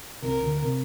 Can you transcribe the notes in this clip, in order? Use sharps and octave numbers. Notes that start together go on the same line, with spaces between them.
C2 C3 A#4
D2 D3
C3